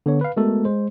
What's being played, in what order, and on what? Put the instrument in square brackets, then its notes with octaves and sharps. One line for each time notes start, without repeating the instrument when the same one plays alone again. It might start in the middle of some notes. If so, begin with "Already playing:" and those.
[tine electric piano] D3 B3 C#5
B4 F5
G#3 A3 B3 F#4 A4 A#4
G#3 C5